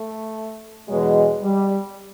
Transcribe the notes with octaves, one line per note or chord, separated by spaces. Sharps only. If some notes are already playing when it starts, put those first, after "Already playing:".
Already playing: A3
E2 B2 F#3 G#3
G3